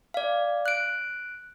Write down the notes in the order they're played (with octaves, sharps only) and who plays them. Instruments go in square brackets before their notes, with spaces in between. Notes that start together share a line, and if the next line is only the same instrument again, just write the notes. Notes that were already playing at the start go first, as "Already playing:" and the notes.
[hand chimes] D5 F5
F#6 D7